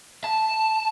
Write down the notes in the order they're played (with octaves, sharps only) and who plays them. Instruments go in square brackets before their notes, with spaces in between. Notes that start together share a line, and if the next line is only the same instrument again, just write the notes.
[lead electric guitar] A5